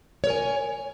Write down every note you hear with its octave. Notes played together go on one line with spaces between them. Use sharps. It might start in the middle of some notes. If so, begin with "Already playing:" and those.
A#4 C#5 G#5